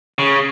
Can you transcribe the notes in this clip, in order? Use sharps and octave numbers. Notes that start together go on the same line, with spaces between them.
C#3